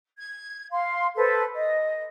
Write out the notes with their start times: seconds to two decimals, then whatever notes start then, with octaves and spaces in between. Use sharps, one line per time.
0.17 G#6
0.71 F5 C6
1.15 A4 B4 C5
1.54 D#5